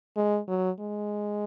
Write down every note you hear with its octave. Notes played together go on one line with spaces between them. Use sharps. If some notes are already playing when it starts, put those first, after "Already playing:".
G#3
F#3
G#3